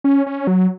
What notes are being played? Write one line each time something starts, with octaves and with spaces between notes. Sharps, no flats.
C#4
C#4
F#3